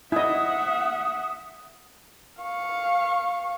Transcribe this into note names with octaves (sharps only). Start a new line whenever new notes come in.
E4 D#5 E5 F#5 D#6
F5 C#6